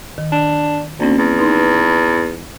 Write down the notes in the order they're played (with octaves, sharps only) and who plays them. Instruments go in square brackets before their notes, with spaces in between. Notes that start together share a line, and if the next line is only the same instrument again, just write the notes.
[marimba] D#3
[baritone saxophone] D4
[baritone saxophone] D2 [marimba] A#3 C4 C#4
[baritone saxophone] E2
[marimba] D#4 B4 C6